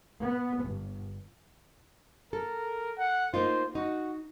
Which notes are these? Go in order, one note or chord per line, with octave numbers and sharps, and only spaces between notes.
B3
G1
A4 A#4
F#5
A#3 D#4 F4 C5
D#4 F#4